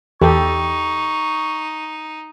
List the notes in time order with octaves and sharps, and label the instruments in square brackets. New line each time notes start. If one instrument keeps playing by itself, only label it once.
[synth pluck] E2 [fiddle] D#4 [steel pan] G4 A4 [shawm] C#6